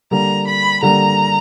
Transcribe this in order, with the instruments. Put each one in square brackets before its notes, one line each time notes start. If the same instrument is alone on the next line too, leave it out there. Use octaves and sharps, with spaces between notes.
[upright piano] D3 G3 A#3 [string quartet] A#5
[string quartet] B5
[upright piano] D3 G3 A#3 [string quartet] A#5